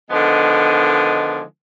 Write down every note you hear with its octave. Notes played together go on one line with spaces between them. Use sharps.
D3 D#3 F3 G#3 B3